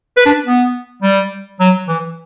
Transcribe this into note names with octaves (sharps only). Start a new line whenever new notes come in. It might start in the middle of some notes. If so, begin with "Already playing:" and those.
B4
D4
B3
G3
F#3
E3